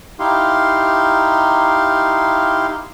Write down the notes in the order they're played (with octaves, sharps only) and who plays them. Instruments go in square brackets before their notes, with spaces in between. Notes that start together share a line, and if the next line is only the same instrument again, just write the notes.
[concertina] D#4 E4 G4 F5 C6